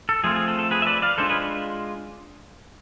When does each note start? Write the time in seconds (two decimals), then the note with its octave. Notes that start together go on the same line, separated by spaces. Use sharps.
0.09 A4
0.24 F3 A3 C4 F4 G#4
0.36 G#4
0.48 A4
0.59 A4
0.71 G#4 B4
0.82 E5
0.86 B4 D5
1.02 D5 F5
1.18 G#3 D4 F4 A4 C5
1.29 G#4 B4